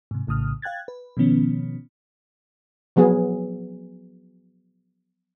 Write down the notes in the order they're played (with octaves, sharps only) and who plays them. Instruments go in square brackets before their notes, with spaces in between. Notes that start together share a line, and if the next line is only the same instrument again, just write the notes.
[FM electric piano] G#2 C3
A#1 A2 C#3 D#6 F6
F5 G5 F#6 G#6 A6
B4
B2 D#3 F3 B3 C#4
[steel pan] F3 F#3 B3 G#4